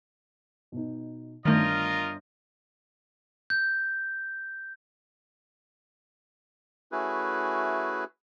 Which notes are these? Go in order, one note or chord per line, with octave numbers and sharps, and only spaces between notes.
B2 D#4
G1 D#3 A3 D4 F4 A#4 D#5 G6
G6
A3 C#4 E4 F#4 G#4 B4